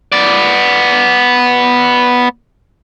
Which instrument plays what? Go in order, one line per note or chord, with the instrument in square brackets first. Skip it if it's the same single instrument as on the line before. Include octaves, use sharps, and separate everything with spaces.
[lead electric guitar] B3 D5